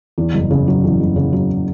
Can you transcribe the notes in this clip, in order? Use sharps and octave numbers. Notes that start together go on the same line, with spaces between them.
E2
F#1
C#3
F#3
E2
F#1
C#3
F#3